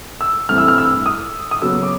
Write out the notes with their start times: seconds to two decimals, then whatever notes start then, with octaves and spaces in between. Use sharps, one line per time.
0.21 E6
0.49 G2 E3 A3 C4 E4 F6
0.58 E6
0.68 F6
0.78 E6
1.06 D#6
1.51 D#6
1.62 C#3 F#3 B3 E6
1.83 D6